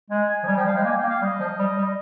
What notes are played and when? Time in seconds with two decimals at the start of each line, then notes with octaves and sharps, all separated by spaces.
0.10 G#3 G#5
0.29 G#5
0.43 F3
0.47 G3 G#5
0.57 F3 G5
0.66 G3 F5
0.75 G#3 G5
0.84 A#3 G#5
0.97 G5
1.03 A#3
1.09 F5
1.22 G3 D#5
1.40 F3
1.59 G3
1.77 G3